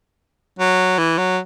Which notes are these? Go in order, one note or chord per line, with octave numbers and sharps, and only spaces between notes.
F#3
E3
F#3